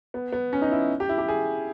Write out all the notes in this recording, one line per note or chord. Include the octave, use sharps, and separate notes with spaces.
B3
B3
C#4
D#4
E4
G4
E4
G4
G#4